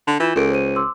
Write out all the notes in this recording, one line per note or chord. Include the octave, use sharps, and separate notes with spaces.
D3
E3 F4 G6 E7
C#2 A4 A#4 D7
C5 D#7
C6 D6 E6